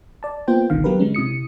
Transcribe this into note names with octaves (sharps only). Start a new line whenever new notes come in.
D5 A5
A#3 B3 F4 C5 G5
G1 C#2 B2 D3 D#3 F5
F#3 B3 G4 A#4 B4
D3 G#3 C#4
C3 E4 D#6 C#7